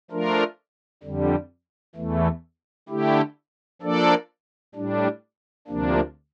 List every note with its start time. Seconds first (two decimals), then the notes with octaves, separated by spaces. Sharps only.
0.11 F3 A3 D4 F4 A#4
1.03 F2 D3 G3
1.96 E2 E3 A3
2.89 D3 A3 E4 G4
3.82 F3 A#3 D4 A4 D5
4.75 A2 G3 D4
5.68 D2 C3 F3 A#3 D4